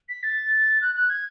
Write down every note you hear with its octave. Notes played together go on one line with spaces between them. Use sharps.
B6
A6
F#6
F#6
G#6